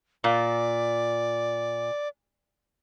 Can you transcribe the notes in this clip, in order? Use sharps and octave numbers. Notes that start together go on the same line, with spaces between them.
A#2 D5